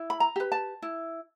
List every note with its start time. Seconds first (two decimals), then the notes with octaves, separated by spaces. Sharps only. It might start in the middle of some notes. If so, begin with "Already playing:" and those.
Already playing: E4
0.10 B5
0.20 A#5
0.36 G4 B4
0.52 A5
0.82 E4